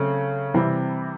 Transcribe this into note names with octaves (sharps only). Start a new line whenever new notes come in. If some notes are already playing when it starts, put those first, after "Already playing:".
Already playing: C#3 F#3 A3 C4
C3 E3 G3 C4